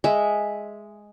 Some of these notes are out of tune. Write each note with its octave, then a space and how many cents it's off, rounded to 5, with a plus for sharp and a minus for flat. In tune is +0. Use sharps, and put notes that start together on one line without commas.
G#3 +0 E5 +0